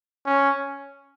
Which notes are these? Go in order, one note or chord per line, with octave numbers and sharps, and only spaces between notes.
C#4